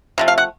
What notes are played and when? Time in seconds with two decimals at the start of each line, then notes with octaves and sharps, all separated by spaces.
0.18 C3 F3 A3
0.28 F5
0.38 F#5